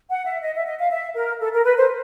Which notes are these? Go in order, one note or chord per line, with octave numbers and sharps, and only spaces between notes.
F#5
E5
D#5
E5
D#5
F5
E5
A#4
A4
A#4
B4
C5